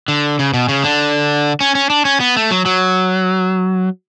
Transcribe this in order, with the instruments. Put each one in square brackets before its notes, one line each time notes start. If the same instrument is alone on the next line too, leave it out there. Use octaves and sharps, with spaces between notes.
[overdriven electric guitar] D3
C#3
B2
C#3
D3
C#4
C#4
D4
C#4
B3
A3
F#3
F#3